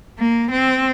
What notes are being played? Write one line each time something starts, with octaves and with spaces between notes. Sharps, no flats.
A#3
C4